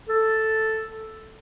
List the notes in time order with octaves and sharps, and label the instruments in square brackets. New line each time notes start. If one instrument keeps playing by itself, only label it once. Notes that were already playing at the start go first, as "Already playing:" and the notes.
[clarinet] A4